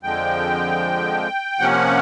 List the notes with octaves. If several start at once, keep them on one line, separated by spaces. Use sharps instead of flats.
F2 D3 F3 G#3 G5
C3 F3 A#3 C#4 F#5